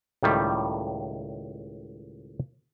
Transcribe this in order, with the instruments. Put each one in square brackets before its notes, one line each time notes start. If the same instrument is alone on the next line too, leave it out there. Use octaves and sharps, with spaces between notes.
[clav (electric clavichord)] C#2 A2 D#3 G3